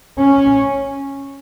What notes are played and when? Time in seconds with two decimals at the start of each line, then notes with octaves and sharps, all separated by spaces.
0.19 C#4